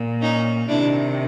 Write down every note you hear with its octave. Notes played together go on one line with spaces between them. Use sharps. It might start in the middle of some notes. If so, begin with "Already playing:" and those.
Already playing: A#2
C#4 D#4
C3 D#3 D4 E4